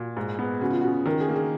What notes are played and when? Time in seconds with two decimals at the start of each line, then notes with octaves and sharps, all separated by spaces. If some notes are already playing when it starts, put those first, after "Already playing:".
Already playing: A#2 F#4
0.17 G#2
0.39 B3
0.61 C#3 F#4
0.71 F4
0.81 C#3 F#4
1.06 D#3 A#4
1.21 G#4
1.29 A#3
1.36 G#4